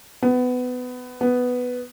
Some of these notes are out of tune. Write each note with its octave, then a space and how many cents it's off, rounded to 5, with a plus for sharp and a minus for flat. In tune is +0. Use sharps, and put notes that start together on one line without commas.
B3 +20
B3 +5